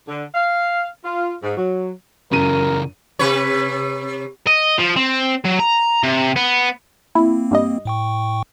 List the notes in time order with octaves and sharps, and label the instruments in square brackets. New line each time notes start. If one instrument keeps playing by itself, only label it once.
[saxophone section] D3
F5
F4
G#2
F#3
[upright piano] F#2 D#7 [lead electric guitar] C#3 E3 [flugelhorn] A#4
[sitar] C3 B4 C#5
[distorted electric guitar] D#5
F3
C4
F#3
A#5
C3
B3
[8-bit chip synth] A#3 C4 [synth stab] E4
[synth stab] G2 G3 D#5
[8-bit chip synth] A2 G5 C#6